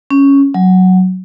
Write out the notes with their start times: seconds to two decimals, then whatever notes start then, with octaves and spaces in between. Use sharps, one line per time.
0.11 C#4
0.54 F#3